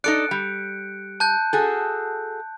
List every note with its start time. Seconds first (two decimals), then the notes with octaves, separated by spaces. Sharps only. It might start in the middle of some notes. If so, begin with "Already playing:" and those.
0.04 D#4 A4 D5 F#6 C#7 D7
0.31 G3
1.20 A5 F#6 G6
1.53 F#4 G#4 A4